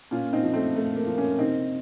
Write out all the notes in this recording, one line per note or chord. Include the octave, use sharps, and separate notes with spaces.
A#2 C#4 F4
C4 D#4
F3
A3 C4
A#2 A3
A#3
F3
A#3 C#4
C3 C4 D#4